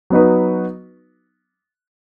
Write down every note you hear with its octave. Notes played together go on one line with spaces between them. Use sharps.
F#3 B3 D#4 F#4 B4